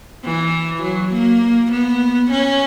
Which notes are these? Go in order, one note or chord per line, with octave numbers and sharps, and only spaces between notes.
E3
F#3
A#3
B3
C#4